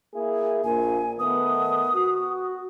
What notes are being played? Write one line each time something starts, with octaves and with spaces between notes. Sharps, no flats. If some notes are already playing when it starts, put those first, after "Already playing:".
A#3 E4 G#4
A#1 A#2 G#5
D#3 A3 B3 D#6
F#4